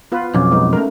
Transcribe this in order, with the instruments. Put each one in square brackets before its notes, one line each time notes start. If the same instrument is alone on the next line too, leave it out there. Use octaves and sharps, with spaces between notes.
[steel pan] B3 F4 B4
[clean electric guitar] B1 F2 [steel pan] C#4 [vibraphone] D6
[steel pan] G#3 B3 D#4
[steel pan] A3 A#4 [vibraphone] C#4